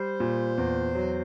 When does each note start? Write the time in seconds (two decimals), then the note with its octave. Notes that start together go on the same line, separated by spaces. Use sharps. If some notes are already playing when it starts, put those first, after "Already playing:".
Already playing: G3 C5
0.20 A#2
0.58 E2
0.95 F#3